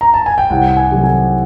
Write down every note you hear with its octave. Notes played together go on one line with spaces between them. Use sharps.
A#5
A5
G#5
G5
C2 F#5
G#5
C3 D#3 F#3 A3
G#5